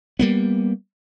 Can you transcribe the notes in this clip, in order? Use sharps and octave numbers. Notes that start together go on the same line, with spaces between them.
G3 A#3 B3